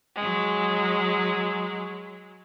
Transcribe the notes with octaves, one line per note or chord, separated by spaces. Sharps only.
F#3 G#3